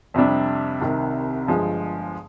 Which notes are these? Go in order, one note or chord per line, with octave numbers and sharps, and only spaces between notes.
F2 C3 G3 D4
C2 C3 D#3
G1 G2 F3 G#3